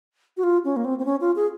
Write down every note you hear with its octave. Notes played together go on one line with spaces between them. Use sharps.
F#4
F4
C#4
A#3
C4
C4
C#4
F4
G#4